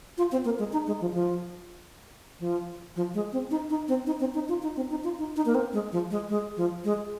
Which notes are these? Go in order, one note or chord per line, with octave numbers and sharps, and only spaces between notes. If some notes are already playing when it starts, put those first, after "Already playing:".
F4
C4
A#3
G#3
D#4
G#3
F3
D#3
F3
F3
F3
G#3
C4
D#4
D#4
C4
D#4
C4
D#4
F4
D#4
C4
D#4
F4
D#4
D#4
A#3
C4
G#3
F3
G#3
G#3
F3
G#3